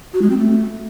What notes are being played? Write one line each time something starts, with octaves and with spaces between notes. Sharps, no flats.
F#4
G#3
C4
A3